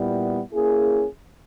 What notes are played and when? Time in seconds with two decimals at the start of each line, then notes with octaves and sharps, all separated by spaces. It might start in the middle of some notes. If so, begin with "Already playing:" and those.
Already playing: A#2 G3 B3 E4
0.53 A#3 C#4 E4 G#4